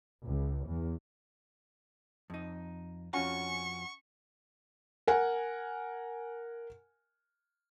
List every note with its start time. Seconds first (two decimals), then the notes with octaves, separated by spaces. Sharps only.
0.24 C#2
0.67 E2
2.30 F2 D#4
3.13 F2 C#4 F4 F#4 F#5 G#5 C#6
5.07 A#4 F#5 G#5